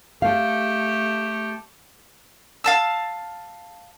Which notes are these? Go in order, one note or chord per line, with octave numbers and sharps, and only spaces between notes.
A3 G4 F5
F5 A5 E6